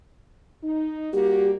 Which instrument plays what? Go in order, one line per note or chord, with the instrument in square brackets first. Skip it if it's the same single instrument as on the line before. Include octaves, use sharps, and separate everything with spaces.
[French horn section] D#4
[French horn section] G3 A#3 F#4 [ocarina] G4